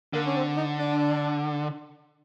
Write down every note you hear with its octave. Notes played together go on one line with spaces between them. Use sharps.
D3 A#3
C#4
C4
D#4
D4